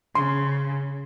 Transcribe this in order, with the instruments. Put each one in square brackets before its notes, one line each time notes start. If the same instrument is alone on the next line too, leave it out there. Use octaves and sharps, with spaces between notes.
[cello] C#3 [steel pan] C6